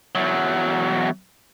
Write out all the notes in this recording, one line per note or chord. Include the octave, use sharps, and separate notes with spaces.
E2 F#3